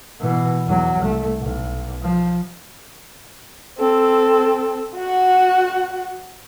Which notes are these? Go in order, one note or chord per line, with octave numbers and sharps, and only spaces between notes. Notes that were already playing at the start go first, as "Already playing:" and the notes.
B2 E3
E2 F#3
C2 A3
B1
F3
C4 A4
F#4 F#5